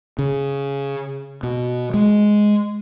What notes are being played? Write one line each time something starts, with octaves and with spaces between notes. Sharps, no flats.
C#3
B2
G#3